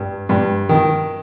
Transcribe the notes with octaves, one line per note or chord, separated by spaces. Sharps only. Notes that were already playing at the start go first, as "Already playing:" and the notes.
Already playing: G2
G2
D#3